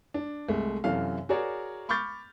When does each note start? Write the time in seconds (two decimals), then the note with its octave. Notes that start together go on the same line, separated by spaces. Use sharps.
0.14 D4
0.48 C2 G#3 A3
0.84 F#2 C3 E3 A4 F5
1.29 F#4 G#4 A#4 C#5 D5
1.89 B5 C#6 D6 F6 G6 A6